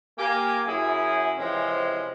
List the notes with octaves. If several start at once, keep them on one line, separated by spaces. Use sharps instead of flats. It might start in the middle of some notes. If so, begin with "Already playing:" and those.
A#3 G4 G#5
F#2 E4 G#4
C3 E3 F3 G#3 C4 C#4